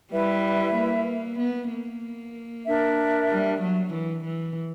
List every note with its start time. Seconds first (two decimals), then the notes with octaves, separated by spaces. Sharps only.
0.12 G3 E4 B4 E5
0.75 A#3
1.39 B3
1.71 A#3
2.66 D4 A#4 E5
3.30 G3
3.61 F#3
3.93 E3
4.24 E3